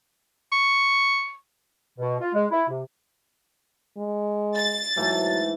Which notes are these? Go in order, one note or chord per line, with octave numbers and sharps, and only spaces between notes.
C#6
B2
F4
G#3
E4
C3
G#3
A6
G#2 E3 F#3 A3